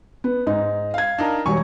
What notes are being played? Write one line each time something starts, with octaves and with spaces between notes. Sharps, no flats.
B3
G#2 D#4
F5 G#6
D4 D#4 A#4
E1 G3 C#5 G#5 C#6